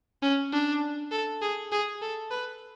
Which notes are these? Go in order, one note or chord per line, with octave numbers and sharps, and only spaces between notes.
C#4
D4
A4
G#4
G#4
A4
B4